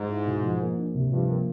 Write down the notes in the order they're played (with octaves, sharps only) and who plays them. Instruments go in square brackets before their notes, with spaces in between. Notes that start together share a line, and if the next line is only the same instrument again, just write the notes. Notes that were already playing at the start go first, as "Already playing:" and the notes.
Already playing: [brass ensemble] G#2
[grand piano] E4
B2
F3
A#3
D4
C3
[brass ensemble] G2 [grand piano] F3
[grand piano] A#3